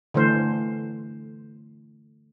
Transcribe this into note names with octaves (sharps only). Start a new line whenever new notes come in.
D3 E3 A3 C5